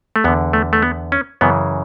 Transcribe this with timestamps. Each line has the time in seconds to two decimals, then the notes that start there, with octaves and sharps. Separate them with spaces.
0.16 A3
0.24 E2 D3 B3
0.53 A3
0.73 A3
0.82 B3
1.12 C#4
1.41 F#2 C#3 E3 B3